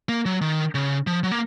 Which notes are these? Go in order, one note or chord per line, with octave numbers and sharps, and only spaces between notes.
A#3
F#3
D#3
C#3
F3
F#3
A#3